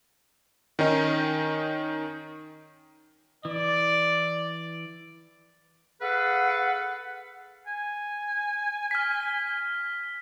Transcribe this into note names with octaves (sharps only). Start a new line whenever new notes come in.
D#3 C#4 D#4
E3 D5
G#4 A4 B4 F5 F#5
G#5
F6 B6